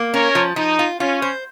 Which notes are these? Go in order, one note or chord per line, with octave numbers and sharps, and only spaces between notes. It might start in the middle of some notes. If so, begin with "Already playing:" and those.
Already playing: A#3
C#4 A#4 C#5
F3
F3 D#4
F4
C#4 F4
C5